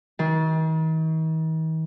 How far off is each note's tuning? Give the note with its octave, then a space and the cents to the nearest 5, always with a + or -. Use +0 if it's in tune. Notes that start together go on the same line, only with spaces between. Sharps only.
D#3 +45